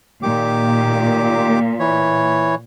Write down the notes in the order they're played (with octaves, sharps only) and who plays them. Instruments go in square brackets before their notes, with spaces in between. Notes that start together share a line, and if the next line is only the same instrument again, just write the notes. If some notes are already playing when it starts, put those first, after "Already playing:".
[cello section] A#2 [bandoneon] D#3 G4 D6
[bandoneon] E3 C#5